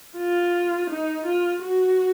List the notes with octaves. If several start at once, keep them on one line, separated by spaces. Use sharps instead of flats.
F4
D#4
F4
F#4